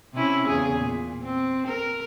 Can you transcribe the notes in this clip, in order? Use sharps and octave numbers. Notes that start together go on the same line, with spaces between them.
C3 C#4 E4
E2 C#3 G#4
A#2
C4
A#4